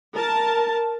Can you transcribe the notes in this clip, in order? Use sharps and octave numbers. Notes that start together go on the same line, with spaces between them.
A#4 A5